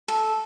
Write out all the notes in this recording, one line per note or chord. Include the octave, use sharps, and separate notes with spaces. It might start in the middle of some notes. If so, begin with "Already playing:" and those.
A4